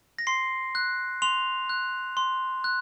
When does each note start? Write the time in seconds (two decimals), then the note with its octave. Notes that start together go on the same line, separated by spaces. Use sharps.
0.19 A#6
0.27 C6 C7
0.75 F#6
1.22 C6 F7
1.69 F#6
2.17 C6
2.64 F#6